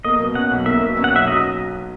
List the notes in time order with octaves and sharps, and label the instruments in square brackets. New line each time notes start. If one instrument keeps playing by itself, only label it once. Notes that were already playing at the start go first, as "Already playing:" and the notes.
[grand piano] A#3 [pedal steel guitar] D#5
[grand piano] B2
[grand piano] C#4 [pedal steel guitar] F#5
[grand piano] B1
[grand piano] A#3 [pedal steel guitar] E5
[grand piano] B2
C#4
[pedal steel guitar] F#5
[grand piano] B1 [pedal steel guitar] E5
[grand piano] F#3 [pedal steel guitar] D#5